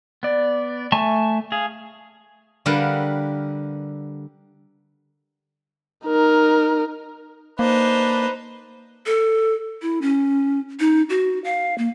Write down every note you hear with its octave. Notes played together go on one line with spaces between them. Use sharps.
B3 D5
A3 E5 G#5 A5 C#6
G#4 F5
D3 G3 A#4 B4 F5 F#5
D#4 A#4
A#3 D4 D#4 B4 C5
A4
E4
C#4
D#4
F#4
F5
A#3